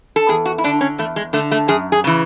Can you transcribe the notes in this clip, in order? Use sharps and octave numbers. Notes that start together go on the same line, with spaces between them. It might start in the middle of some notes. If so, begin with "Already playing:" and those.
A4
E2 G#4
F#4
E4
D3 D4
C#4
E2 A3
G#3
D3 A3
A3
F#2 G#4
G#4
C#3 E3